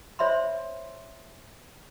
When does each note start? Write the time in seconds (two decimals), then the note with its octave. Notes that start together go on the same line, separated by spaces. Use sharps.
0.19 C5 C#5 E5 B5 C6